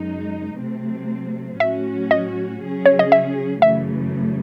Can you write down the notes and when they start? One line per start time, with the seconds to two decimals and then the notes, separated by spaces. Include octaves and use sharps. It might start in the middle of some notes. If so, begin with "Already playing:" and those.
Already playing: F#2 C#3 G#3 D#4
0.59 C3 F#3 A3 C4
1.60 A2 F#3 C#4 F#4 E5
2.11 D#5
2.62 C#3 F#3 C#4 G#4
2.86 C#5
2.99 D#5
3.12 E5
3.62 F#2 C#3 E3 A3 E5